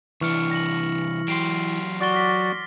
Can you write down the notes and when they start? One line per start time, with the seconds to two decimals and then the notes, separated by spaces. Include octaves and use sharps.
0.21 C2 E3 D4 C#6 F6 C#7
0.51 A#6 F#7
1.28 F#3 G4 C6 C7 D7
2.00 F#4 D5 D6 A6 G7
2.13 F6 A#6 B6